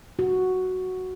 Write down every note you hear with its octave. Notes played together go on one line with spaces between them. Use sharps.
F#4